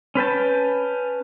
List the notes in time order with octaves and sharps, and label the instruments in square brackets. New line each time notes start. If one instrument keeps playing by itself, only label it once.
[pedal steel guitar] C#4 B4 G5 A5